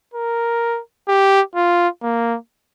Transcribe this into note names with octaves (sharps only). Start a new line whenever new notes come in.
A#4
G4
F4
A#3